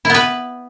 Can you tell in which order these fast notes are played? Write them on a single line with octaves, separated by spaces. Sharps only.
E4 B3 B4